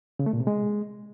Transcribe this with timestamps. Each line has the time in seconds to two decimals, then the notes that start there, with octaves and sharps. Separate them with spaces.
0.19 C#3
0.26 A3
0.33 A#2
0.40 C3
0.47 G#3